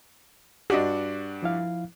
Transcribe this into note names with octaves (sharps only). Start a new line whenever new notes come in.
G2 D4 F#4 G4 D#5
F3 E4 F5